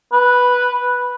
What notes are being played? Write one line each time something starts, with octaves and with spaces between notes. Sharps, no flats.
B4